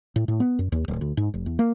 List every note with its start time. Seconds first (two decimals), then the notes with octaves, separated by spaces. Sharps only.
0.16 A2
0.28 A2
0.40 B3
0.59 F#2
0.72 D#2
0.88 D1
1.01 D2
1.17 G#2
1.34 F1
1.46 E2
1.59 A#3